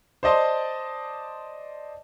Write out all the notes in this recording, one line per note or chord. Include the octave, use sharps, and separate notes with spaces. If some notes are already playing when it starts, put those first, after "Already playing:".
C5 D5 D#5 A5 C6